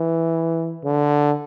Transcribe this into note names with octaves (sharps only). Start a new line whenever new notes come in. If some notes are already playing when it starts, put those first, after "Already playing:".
Already playing: E3
D3